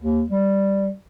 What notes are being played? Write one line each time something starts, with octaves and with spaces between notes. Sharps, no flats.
D#2
G3